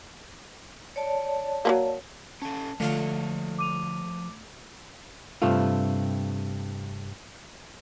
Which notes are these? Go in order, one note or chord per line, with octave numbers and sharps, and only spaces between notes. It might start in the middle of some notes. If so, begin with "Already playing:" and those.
C#5 D5 A5
F#3 G3 A#3
C#4 A4 A5
D3 F3 A3 F4 C#5 F5
D6 D#7 F7
G2 C3 A3 F4